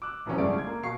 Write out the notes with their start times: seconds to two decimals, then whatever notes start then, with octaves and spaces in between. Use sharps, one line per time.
0.02 D6 E6 F#6
0.26 F1 B1 C3 E3 B3 C#4
0.38 G1 G#3 A3 C#4 D5 D7
0.54 F4 G#6
0.66 A#3
0.83 B2 F5 C#6 C7